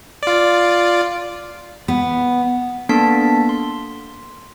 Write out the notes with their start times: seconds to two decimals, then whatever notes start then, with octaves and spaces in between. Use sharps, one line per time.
0.23 F4 D5
1.88 B3
2.89 A#3 B3 D4 A4 A5 B6
3.49 C6